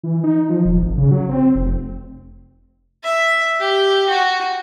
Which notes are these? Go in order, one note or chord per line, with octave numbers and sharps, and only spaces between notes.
E3
D#4
F3
D#1
G#1
C#3
F#3
C4
F1
E5
G4
F#4